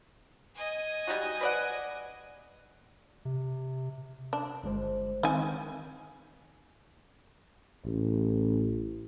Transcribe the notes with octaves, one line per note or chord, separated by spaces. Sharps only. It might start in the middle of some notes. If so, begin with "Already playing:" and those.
D#5 G#5
G3 D#4 F#4
B4 D5 F#5
C3
D4
G1 G#3 C5
D#3 C4 D#4 G#5
A1